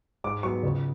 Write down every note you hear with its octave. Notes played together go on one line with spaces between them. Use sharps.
G#2 D6
F#3 B3 C#6
C#2